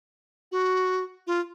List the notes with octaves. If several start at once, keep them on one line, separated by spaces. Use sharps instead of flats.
F#4
F4